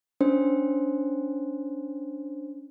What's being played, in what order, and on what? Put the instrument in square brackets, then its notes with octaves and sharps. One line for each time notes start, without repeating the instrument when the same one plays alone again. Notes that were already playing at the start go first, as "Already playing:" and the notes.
[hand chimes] C#4 D4 C5